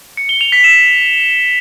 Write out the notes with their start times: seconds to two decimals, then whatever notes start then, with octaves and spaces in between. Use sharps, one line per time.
0.17 C#7
0.29 G7
0.41 F7
0.52 B6
0.64 E7